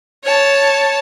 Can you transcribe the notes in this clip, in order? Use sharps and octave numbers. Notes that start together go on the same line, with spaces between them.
C#5 A5